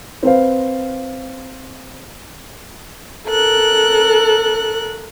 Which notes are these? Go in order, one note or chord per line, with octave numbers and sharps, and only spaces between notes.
C4 B4 C5 F5
A4 A#4 F#6